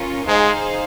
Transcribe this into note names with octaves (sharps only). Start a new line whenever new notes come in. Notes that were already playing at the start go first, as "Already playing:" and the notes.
Already playing: C#4 F4 A#4
G#3 D#4 G#4 C5 F5